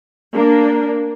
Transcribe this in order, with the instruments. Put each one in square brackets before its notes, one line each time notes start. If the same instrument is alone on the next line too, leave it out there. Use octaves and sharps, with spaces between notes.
[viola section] A#3 D4